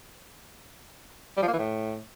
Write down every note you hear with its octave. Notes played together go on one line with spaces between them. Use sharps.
G3
F3
A#3
E3
A2